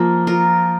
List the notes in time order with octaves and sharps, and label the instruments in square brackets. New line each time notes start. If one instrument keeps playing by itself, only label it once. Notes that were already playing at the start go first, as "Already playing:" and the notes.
Already playing: [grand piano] F3 [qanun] A#3
[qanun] F4 A#4